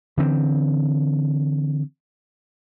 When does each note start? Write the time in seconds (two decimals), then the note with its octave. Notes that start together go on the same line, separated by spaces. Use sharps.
0.17 D3 E3 C4